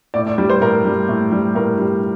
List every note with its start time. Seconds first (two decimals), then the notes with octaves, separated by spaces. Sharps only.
0.14 A2 D5
0.27 D5
0.38 G3 D5
0.50 C5
0.61 A2 A#4
0.85 G3
1.09 A2
1.31 G3
1.55 A2 A#4
1.78 G3